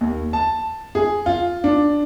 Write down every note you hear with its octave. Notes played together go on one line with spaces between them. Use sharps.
D#2
A5
G#4
F4
D4